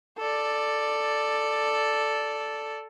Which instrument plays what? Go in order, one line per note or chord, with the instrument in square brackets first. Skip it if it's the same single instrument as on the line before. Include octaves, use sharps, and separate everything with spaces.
[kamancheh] A4 D5